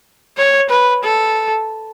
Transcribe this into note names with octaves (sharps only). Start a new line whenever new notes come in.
C#5
B4
A4